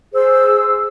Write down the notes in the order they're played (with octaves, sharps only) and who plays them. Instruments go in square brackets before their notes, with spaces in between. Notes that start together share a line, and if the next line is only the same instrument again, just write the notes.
[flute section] G#4 C5 E6